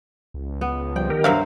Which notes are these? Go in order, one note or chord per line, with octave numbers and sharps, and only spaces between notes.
C#2
B3
F3 G3 G5
D#3 G4 A#4
G2 F#3 C5 E5 F5